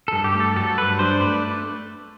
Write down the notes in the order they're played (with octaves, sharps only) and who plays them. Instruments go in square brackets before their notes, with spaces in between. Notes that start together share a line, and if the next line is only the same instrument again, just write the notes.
[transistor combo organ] G2 [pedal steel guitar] A4
[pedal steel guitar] G4
[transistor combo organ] A3
[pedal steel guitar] A4
[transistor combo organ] F#3 [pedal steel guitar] A4
[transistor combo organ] G2 [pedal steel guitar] B4
[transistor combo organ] D4 [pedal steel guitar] C5
[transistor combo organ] A3 [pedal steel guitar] B4